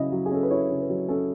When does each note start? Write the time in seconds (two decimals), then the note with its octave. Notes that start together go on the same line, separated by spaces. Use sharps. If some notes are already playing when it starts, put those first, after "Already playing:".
Already playing: C#3 F#3 C#4 E4 D#5
0.12 F#3
0.26 G#4
0.31 C#4 A4
0.43 B4
0.51 E4 C#5
0.70 C#3
0.80 B4
0.89 F#3
1.09 C#4 A4